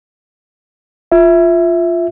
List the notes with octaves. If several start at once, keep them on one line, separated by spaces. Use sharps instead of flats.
F4 E5